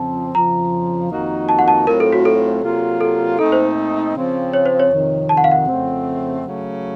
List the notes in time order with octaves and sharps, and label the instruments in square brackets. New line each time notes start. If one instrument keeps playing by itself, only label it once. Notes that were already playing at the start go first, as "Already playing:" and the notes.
Already playing: [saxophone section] F2 C#3 F3 C4 [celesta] A5
[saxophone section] F2 C#3 F3 [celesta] A#5
[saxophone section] F2 D#3 A#3 D#4 F#4
[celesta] A5
F#5
A5
[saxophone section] A2 F#3 A3 C4 F4 [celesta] A#4
[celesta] A4
F#4
A4
[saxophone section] C3 F#3 A#3 F4
[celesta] A4
[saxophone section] A#2 A3 C4 D#4 [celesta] A4
[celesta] C5
[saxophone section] C#3 F3 C4
[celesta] C#5
C5
C#5
[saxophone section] F2 C3 D#3
[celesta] A5
F#5
F5
F#5
[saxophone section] F2 C#3 A3 C4
C#3 F#3 A3